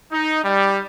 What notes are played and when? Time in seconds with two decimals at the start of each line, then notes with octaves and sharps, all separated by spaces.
0.12 D#4
0.44 G3